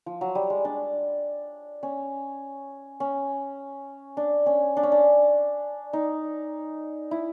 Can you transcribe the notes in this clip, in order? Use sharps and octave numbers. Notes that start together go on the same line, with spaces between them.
F3
F#3
G3
G#3
D4
C#4
C#4
D4
C#4
D4
C#4
D4
D#4
E4